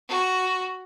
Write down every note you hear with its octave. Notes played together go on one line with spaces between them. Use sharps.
F#4